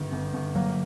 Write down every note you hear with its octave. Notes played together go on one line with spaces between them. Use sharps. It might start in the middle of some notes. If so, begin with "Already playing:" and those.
Already playing: G1 D#3 G3
G1
G1
F#3 A#3